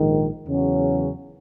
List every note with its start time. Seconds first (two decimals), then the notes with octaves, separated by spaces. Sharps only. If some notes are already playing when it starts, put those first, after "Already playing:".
Already playing: A#1 G#2 D#3
0.47 E2 C#3 F#3 C#4